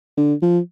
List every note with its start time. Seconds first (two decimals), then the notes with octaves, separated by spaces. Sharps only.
0.17 D3
0.42 F3